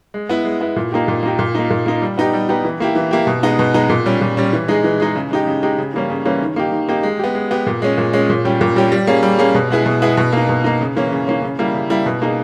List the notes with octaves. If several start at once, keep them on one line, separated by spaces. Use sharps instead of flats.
G#3
B3 E4
G#3
B3 E4
A#2
A#3 D#4 G4
A#2
A#3 D#4 G4
A#2
A#3 D#4
A#2
A#3 D#4
G3
B3 D#4 G4
G3
B3 D#4 G4
E3
A#3 E4 G4
E3
A#3 E4 G4
B2
G#3 B3 D#4
B2
G#3 B3 D#4
A#2
G3 C#4
A#2
G3 C#4
E3
G#3 D#4 G#4
E3
G#3 D#4 G#4
C#3
G#3 D#4 G4
C#3
G#3 D#4 G4
C#3
E3 G3 A#3 C#4
C#3
E3 G3 A#3 C#4
D#3
A#3 D#4 G4
D#3
A#3 D#4 G4
G#3
B3 G4
G#3
B3 G4
A#2
G#3 C#4
A#2
G#3 C#4
A#2
G3 C#4 G4
A#2
G3 C#4 G4
G3
A#3 C#4 G#4
G3
A#3 C#4 G#4
B2
G#3 B3 E4 G#4
B2
G#3 B3 E4 G#4
B2
A#3 D#4
B2
A#3 D#4
C#3
E3 A#3 C#4
C#3
E3 A#3 C#4
C#3
G3 A#3 E4
C#3
G3 A#3 E4
B2
A#3 D#4 G#4